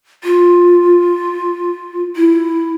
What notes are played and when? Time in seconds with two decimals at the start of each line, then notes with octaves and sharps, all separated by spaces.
0.24 F4
2.16 E4